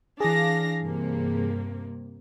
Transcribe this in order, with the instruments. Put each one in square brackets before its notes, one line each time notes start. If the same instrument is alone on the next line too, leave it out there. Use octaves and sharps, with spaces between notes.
[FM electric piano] E3 G#4 [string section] D4 F5 A#6
[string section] G2 C3 A#3